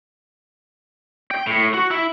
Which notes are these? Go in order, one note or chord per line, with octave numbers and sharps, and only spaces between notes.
G5
A2
F#4
E4